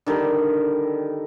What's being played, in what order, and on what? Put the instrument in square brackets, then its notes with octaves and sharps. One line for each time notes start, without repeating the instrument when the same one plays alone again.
[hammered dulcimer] D3 D#3 G3 A#4